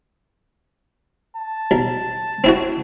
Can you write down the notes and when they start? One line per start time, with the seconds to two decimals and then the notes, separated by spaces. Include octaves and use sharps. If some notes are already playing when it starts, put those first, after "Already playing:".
1.36 A5
1.71 B1
2.44 C4 E4 F#4